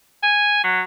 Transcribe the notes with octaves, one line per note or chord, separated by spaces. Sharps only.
G#5
F#3